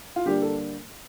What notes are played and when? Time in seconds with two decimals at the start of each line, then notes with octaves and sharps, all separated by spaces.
0.16 F4
0.26 D3 G3 A#3 D4 G4
0.42 A4